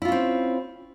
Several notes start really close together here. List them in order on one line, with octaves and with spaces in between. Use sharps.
E4 F4 C#4 C4